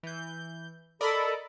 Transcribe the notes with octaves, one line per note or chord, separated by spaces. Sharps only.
E3 G6
A4 A#4 D5 D#5 B5